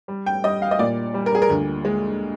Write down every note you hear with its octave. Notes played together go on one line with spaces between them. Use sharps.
G3
G5
G3 D#5
F5
D#5
A#2 D5
G3
A#4
G#4
A#4
D2
G#3